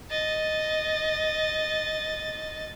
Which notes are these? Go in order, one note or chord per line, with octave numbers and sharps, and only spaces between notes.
D#5 A6